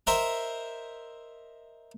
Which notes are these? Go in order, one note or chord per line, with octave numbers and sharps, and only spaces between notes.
A#4 C5 D#5 E5 A#5